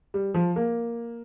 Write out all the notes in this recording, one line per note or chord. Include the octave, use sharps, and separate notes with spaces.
G3
F3
A#3